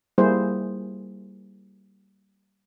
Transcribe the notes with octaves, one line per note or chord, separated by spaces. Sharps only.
G3 A#3 E4 G#4 C5